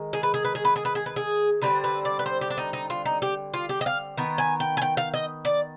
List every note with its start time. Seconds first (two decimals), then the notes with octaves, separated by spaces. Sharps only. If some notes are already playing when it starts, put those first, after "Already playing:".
Already playing: D#3 G#3
0.13 G#4
0.23 B4
0.34 G#4
0.45 B4
0.55 G#4
0.65 B4
0.76 G#4
0.85 B4
0.95 G#4
1.06 B4
1.16 G#4
1.62 D3 G3 C4 B4
1.84 B4
2.05 D5
2.19 B4
2.26 C5
2.41 G4
2.50 D4
2.58 D#4
2.73 D#4
2.90 F4
3.06 D#4
3.22 G4
3.54 F4
3.69 G4
3.81 D#5
3.86 F5
4.18 D#3 B3
4.38 G#5
4.60 G5
4.77 G#5
4.82 G5
4.97 F5
5.14 D#5
5.45 D5